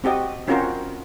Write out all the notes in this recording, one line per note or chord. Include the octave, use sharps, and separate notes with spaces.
C4 F#4 G4 D#5
C4 C#4 F4 F#4 A#4 C5